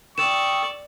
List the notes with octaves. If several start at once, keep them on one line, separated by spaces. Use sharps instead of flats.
D5 G5 C#6 D#6 E6 E7